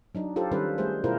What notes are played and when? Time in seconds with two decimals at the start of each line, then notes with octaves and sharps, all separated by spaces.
0.15 F#3 D4 D#4
0.36 F4 G4 A4 C5
0.51 D#3 G3 C#4 A4 B4
0.78 G3 A3 G#4 C5
1.04 B2 E4 F4 G#4 A#4 C5